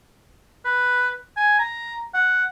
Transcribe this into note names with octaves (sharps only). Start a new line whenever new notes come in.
B4
G#5
A#5
F#5